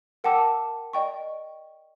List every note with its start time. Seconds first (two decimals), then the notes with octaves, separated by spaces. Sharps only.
0.24 A#4 F#5 G5 A5 D6 E6
0.93 D5 D#5 G5 C#6